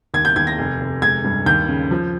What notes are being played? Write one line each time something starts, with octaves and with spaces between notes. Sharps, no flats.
D#2 G#6
G6
D#2 G#6
A#6
F1
F1
G#3 G#6
G2
D#2 G6
C#3
F3